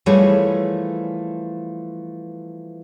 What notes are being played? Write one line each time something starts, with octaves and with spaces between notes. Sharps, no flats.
E3 F3 G3 A3 G#4 C#5